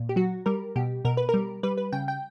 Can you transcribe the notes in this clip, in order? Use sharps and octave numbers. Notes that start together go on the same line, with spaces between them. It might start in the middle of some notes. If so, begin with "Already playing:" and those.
Already playing: A#2
G4
F#3 F#4
G3 A#4
B2 G4
B2 A#4
B4
A#4
G3
G3 B4
B4
C#3 G5
G5